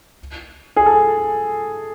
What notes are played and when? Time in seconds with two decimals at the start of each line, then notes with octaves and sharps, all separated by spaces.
0.77 G#4
0.86 A4